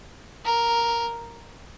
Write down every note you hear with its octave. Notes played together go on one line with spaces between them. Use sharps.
A#4